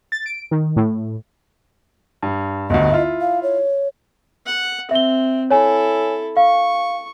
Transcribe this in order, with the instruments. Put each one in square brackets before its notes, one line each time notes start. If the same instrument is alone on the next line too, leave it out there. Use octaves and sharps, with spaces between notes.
[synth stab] A6
D7
D#3
A2
[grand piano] G2
[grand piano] G1 D2 [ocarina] D#5
[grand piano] E4 F4
[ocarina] F5
C#5
[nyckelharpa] F#5
[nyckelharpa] C4 [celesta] E5 G7
[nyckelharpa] E4 A4 [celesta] C#5 G#5
[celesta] F5 [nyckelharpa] C#6